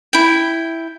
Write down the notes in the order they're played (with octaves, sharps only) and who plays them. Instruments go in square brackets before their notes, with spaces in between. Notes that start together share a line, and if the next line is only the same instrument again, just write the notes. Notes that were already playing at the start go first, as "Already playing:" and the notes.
[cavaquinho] E4 G5